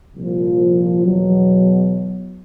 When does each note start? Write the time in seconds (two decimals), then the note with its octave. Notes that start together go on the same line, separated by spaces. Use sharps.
0.15 C2 A#2 F3
1.03 E2 B2 F#3